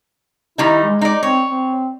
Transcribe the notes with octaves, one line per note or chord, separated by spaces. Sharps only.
D#3 G3 D#4 E4
G#3
D#4 D5
C4 C#5
C4